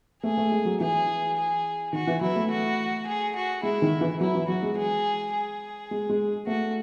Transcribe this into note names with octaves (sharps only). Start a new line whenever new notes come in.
A3 G#4
A3
G#3
F#3
E3 G#4
G#4
D#3 F#4
E3
F#3 E4
A3
F#4
G#4
F#4
G#3 E4
D#3
E3
F#3 E4
E3
F#3 F#4
G#3
G#4
G#4
G#3
G#3
A3 F#4